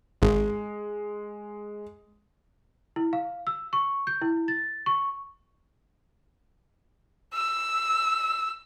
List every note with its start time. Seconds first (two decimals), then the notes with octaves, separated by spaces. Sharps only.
0.22 G#1 G#3
2.96 E4
3.13 F5
3.47 E6
3.73 C#6
4.07 G6
4.22 E4
4.48 A6
4.86 C#6
7.34 E6